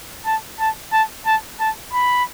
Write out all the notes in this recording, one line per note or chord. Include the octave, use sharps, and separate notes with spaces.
A5
A5
A5
A5
A5
B5